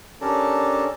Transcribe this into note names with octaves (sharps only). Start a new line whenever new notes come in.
C#4 D4 G4 A4 A#4